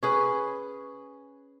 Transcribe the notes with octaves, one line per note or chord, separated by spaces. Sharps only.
C#4 G#4 B4